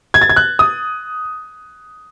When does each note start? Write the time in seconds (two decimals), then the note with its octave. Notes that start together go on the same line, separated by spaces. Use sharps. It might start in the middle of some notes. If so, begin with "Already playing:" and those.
0.14 G#6
0.21 A6
0.30 G#6
0.36 F#6
0.59 D#6